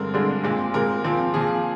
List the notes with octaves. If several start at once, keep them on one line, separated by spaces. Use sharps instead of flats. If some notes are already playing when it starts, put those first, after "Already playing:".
Already playing: G2 D3 G#3 C4 A#4
G2 D3 G#3 C4
A#2 G#3 C4
A#2 G#3 C4 A#4
A#2 F3 C4
A#2 F3 C4 G#4